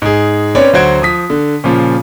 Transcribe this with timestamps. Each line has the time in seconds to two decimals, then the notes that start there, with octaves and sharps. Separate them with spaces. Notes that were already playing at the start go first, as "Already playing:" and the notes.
0.02 G#2 G#4
0.55 C4 C#4 B4 C#5 D5
0.73 D2 F#3 F#4 C5 G#6 D7
1.02 F3 D#6 B6
1.30 D3
1.64 A#2 C#3 F3